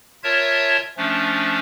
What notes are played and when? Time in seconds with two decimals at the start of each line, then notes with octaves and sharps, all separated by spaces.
0.23 F4 A#4 C#5 E5 A5 G#6
0.97 F3 A3 C#4 D4